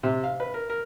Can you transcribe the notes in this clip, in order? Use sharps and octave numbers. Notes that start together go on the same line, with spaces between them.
C3
F5
B4
A#4
A#4